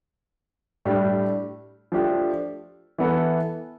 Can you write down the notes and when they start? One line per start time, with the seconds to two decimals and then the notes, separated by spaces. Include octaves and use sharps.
0.85 A2 G3 D4 G4
1.92 F3 A3 D4 G4
2.98 E3 B3 E4 A4